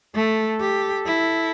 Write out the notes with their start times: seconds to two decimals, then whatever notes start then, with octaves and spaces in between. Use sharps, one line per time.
0.15 A3 A4
0.61 G4
1.06 E4